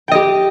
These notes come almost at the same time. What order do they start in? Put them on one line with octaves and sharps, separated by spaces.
G5 D#5 G4